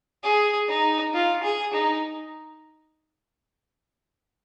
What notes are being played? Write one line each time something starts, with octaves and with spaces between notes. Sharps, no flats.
G#4
D#4
F4
G#4
D#4